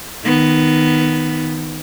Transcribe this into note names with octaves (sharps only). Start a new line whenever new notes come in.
D#3 B3